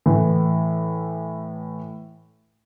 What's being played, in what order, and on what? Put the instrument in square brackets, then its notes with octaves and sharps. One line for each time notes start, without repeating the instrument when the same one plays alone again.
[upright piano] A2 E3